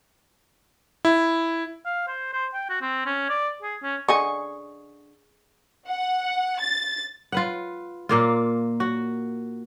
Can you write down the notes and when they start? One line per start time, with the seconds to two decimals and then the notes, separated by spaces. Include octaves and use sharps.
1.05 E4
1.85 F5
2.07 C5
2.33 C5
2.54 G5
2.69 F#4
2.81 C4
3.06 C#4
3.29 D5
3.62 G#4
3.82 C#4
4.09 D3 G#4 D#5 G#5 C#6
5.87 F#5
6.60 A6
7.32 F4 B4 F#5
8.09 A#2 A#3 F4
8.80 F#4